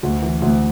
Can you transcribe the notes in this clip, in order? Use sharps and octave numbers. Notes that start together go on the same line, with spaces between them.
D2
E3
D2